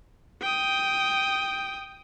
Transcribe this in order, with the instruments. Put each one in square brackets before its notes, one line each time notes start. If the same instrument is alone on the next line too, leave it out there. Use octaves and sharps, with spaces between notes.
[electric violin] G5 D#6